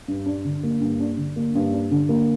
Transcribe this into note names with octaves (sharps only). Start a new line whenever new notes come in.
G2
D4
D3
A#3
G2
D4
D3
A#3
G2
D4
D3
A#3